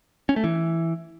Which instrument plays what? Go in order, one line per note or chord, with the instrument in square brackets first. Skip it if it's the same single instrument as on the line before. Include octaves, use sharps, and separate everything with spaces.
[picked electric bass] C#4
A3
E3